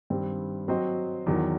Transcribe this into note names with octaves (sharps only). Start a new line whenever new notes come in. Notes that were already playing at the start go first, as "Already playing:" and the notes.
G2 D#3 G3 C4
F#3 C4 F#4 C5 D#5
E2 D#3 F#3